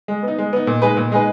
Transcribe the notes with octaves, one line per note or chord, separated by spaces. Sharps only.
G#3
B3 D#4
G#3
B3 D#4
A#2
G#3 D#4 G#4 B4
A#2
G#3 D#4 G#4 B4